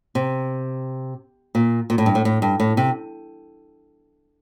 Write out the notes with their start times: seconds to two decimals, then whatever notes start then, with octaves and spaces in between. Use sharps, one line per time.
0.15 C3
1.55 A#2
1.90 A#2
1.98 A2
2.06 G2
2.15 A2
2.25 A2
2.42 G2
2.60 A2
2.77 C3